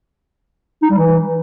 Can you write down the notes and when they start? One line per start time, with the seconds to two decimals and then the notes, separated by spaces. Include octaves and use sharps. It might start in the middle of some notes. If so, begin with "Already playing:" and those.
0.82 D#4
0.90 G3
0.98 E3